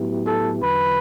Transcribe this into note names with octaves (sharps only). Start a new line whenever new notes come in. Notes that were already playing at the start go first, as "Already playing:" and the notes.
Already playing: A2 F#3 B3 E4 G4
A4
E2 D3 F#3 B4